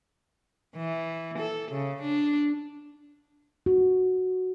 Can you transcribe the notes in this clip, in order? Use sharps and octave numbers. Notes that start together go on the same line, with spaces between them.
E3
A4
C#3
D4
F#4